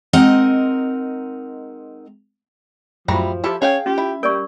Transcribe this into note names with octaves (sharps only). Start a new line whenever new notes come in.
G#3 C4 D#4 A#4 D#5 F#5
F#2 A2 F3 G3 E4 F#4 A#5
E4 F4 G4 A4
C#4 G#4 C#5 F5 G5
C#4 F4 G4
E4
G3 A#4 D5 G5 C#6